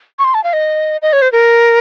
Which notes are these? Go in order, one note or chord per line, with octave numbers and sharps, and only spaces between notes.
C#6
C6
A5
F5
D#5
D#5
C#5
C5
A#4